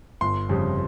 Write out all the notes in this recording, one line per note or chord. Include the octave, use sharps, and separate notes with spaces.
G1 C6
F2 C#3 G3